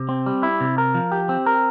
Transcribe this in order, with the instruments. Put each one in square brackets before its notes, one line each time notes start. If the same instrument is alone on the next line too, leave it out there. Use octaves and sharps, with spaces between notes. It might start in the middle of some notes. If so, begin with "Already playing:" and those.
Already playing: [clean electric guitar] C3
C4
G3
E4
C3
A#4
F3
G4
C4
A#4